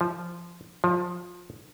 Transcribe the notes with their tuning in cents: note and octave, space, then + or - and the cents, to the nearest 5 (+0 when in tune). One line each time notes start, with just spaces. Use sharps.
F3 -10
F3 +20